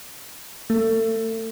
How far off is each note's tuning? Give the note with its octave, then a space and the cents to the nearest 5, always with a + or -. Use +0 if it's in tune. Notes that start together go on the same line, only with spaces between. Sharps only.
A3 +35